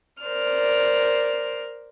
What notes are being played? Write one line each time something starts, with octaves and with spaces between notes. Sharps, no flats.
A#4 C5 D5 F6